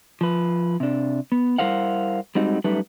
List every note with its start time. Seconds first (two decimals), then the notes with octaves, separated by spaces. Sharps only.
0.21 F3 B4
0.80 C3 D4
1.32 B3
1.58 G3 E4 A#4 C5 F5 F#5
2.35 G3 G#3 C4 D#4 F#4
2.64 F#2 G3 A3 D#4 G4 B4